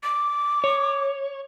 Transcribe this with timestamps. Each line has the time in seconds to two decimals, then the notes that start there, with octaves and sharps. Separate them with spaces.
0.03 D6
0.64 C#5